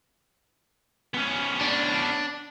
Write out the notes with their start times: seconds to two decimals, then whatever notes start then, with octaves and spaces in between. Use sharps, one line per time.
1.14 B3 C#4
1.61 D4